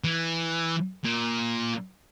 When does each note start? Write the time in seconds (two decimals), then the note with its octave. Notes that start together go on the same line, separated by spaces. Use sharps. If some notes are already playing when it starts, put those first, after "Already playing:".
0.04 E3
1.04 A#2